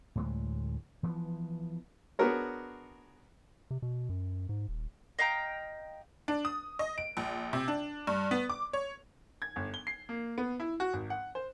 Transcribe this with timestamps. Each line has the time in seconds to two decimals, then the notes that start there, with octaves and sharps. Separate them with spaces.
0.15 D2 A2 F#3 G#3
1.03 E3 F3 B3
2.19 B3 D4 F#4 G#4 A#4 C#5
3.71 C3
3.82 B2
4.09 F#2
4.49 G#2
4.69 D#1
5.19 D#5 F5 G5 A#5
6.28 D4
6.45 D#6
6.79 D#5
6.98 D7
7.17 A#1
7.53 C3
7.68 D4
8.07 G2
8.31 B3
8.50 D6
8.73 C#5
9.42 G#6
9.56 G1
9.74 G7
9.87 C7
10.09 A#3
10.38 B3
10.60 E4
10.80 F#4
10.93 G#1
11.10 F#5
11.35 C5